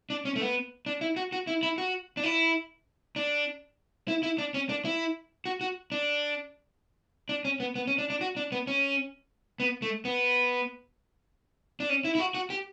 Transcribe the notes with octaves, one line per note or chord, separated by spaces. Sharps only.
D4
C#4
A3
B3
D4
E4
F#4
F#4
E4
E4
F#4
D4
E4
D4
E4
E4
D4
C#4
D4
E4
F#4
F#4
D4
D4
C#4
B3
B3
C#4
D4
D4
F#4
D4
B3
C#4
B3
A3
B3
D4
C#4
E4
E4
F#4
F#4
G4